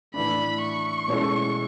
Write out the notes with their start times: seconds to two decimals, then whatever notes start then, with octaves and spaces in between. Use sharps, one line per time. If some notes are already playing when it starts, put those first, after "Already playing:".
0.14 A2 E3 A3 D4 B5
0.61 C#6
1.08 B2 G#3 C#4 E4 A4